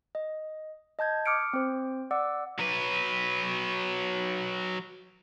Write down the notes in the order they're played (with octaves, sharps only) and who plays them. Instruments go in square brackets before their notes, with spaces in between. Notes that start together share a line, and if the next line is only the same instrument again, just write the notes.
[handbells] D#5
D#5 A5 G6 G#6
D6 D#6 F6 C#7 D7
C4 C5
D5 F#5 D6 E6
[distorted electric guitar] F#3 B4